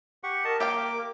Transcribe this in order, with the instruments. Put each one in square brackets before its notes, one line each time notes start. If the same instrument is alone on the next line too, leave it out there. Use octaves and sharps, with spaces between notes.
[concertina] G4 F#5 C#6
[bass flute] A#4 [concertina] D#5 A5
[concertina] A#3 D6 [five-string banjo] G4 F5 G5